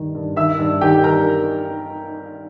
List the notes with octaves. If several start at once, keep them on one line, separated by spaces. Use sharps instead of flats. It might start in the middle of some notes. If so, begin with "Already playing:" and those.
Already playing: G2 D#3
G2
D#3 E5 E6
G2
D#3 G4 G5
G2 A#4 A#5